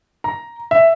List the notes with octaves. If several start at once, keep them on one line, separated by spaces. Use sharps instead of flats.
A#5
E5